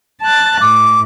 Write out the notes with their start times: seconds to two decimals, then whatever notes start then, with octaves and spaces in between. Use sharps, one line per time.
0.22 A5 F#6 A6
0.61 A2 D6